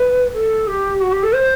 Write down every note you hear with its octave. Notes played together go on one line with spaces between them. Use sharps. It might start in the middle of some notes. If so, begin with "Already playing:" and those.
Already playing: B4
A4
G4
F#4
G4
A4
C5